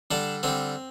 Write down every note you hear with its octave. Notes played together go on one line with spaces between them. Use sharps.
D3 G3 D4
D3 G3 C4